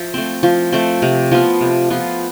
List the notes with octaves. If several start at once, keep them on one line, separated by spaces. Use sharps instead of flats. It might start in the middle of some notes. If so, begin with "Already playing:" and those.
Already playing: F3 E5
A3 C4
F3
A3 C4
C3
F3 B3 F4
C3
F3 B3 F4